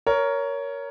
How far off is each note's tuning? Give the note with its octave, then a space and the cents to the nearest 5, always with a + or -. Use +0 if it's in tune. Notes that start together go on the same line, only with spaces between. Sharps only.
A#4 +0 C#5 +15